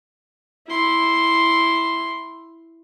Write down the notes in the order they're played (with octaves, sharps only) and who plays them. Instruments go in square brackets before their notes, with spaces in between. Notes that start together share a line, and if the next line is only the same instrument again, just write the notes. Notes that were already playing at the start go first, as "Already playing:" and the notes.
[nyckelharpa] E4 C6